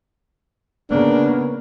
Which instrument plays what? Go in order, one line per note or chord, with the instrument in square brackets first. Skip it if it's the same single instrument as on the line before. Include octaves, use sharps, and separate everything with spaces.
[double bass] C#3 A#3 [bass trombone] B3 [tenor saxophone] D4